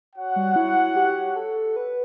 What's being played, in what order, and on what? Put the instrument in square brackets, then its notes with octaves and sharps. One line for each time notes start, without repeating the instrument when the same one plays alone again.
[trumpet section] F#4 C#5 F#5
[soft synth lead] G3
E4
G4
A4
B4